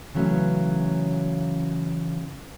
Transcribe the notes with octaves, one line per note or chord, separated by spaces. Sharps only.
C#3 E3 F#3 A3 C#4